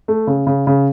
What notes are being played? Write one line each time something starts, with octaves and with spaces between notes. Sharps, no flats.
A3
C#3
C#3
C#3